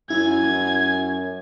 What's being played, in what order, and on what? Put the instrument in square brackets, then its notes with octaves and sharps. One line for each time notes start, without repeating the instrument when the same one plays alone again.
[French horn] F#2 [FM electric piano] E4 [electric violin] G#5 G#6